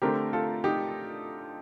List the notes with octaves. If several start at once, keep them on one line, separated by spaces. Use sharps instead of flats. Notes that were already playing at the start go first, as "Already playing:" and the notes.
D3 A3 C4 G4 A#4
F4 A4
D#4 G4